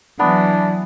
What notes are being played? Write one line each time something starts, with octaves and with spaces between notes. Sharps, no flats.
E3 F#3 B3 D4